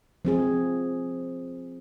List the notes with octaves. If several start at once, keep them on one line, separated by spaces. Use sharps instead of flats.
F3 C4 G#4